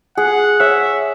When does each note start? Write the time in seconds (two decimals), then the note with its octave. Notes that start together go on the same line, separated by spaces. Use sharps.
0.18 G#4 F#5
0.60 C#5 E5